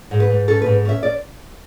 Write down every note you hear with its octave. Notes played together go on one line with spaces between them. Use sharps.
G#2
B4
G#2
C#4 A4
G#2 B4
C#4 E5
D5